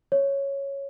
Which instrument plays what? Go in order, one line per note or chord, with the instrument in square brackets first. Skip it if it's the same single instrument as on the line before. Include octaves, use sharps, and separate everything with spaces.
[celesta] C#5